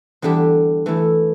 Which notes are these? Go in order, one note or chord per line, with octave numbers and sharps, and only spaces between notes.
E2 D3 G3 D4 G4
E3 A3 E4